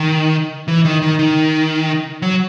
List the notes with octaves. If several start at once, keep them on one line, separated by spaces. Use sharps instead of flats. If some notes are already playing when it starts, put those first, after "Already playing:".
Already playing: D#3
E3
D#3
D#3
D#3
F#3